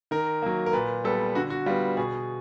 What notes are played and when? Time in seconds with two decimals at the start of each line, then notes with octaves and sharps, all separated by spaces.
0.11 D#3 A#4
0.42 F#3 A#3
0.66 A#4
0.73 A#2 B4
1.04 G3 B3 A4
1.35 D3 F#4
1.50 F#4
1.66 G3 F4
1.69 B3
1.97 B2 G#4